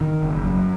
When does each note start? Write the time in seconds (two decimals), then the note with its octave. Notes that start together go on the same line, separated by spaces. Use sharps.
0.01 D#3
0.23 F#1
0.45 F#2